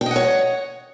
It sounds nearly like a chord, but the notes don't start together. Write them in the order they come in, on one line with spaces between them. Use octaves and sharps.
G5 D#5 F#5 C#5